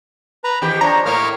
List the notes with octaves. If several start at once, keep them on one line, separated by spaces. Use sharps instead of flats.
B4 A#5
E2 D#3 G4 G5
F3 D4 C#5 A#5
A2 A#3 A#4 C#5 F6